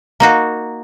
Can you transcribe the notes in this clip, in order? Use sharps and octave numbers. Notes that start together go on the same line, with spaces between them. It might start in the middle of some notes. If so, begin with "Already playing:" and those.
A#3 D#4 F#4